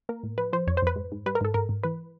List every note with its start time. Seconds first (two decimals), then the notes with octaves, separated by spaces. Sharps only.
0.09 A#3 A#4
0.23 A2
0.38 F3 B4
0.53 F3 C5
0.67 F2 C#5
0.77 C5
0.82 F2 B4
0.96 G#2
1.12 G#2
1.26 G3 B4
1.35 A#4
1.41 G#2 A4
1.54 G#2 A#4
1.69 G#2
1.84 E3 B4